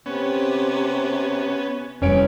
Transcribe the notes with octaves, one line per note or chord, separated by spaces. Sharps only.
C3 B3 C#4
F1 E3 G3 C#4 C#5 D7